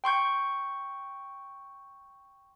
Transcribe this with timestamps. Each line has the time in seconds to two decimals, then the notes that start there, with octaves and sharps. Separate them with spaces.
0.04 G5 C6 C#6 G6